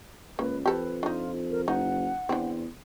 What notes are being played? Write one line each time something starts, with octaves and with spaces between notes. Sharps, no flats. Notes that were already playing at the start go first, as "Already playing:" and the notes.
C#2 A#3 B4
F2 G4 A4 B4
D4 D#4 F4
A#4
F#1 D#4 F#5
E2 C4 D4